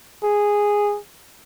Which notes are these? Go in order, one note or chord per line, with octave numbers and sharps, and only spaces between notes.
G#4